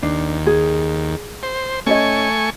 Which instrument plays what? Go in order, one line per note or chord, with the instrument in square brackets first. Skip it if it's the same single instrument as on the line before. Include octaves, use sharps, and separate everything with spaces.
[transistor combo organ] D#2 [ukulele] D4
[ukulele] G#4
[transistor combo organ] C5
[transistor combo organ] A3 G#5 C#6 [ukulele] C#4 C#5 D#5